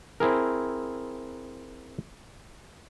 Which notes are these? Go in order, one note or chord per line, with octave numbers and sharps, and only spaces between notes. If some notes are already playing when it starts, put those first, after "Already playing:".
C4 E4 G#4 A#4